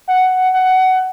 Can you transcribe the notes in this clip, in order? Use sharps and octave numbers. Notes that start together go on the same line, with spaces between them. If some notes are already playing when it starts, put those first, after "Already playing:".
F#5
F#5